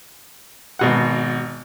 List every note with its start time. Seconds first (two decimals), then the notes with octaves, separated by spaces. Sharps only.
0.79 G#1 B2 F#5